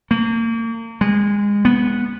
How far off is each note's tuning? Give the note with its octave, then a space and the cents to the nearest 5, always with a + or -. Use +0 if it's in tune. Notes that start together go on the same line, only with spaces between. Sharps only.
A#3 -35
G#3 -25
B3 -10